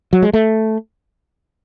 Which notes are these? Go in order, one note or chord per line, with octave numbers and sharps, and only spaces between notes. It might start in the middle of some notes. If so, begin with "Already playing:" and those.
F#3
G#3
A3